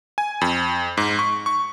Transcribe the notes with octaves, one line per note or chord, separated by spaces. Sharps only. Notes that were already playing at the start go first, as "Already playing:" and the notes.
G#5
F2
G#2
C#6
C#6